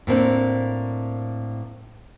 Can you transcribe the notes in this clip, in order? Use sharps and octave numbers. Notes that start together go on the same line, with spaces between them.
A2 A#3 C4 D4